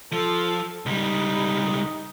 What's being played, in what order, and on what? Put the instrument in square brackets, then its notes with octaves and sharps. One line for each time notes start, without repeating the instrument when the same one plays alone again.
[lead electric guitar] F3 [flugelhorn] A4
[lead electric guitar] C#2 G3 [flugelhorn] D#4